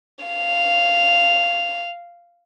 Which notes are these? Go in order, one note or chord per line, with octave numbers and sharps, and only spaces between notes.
F5 F7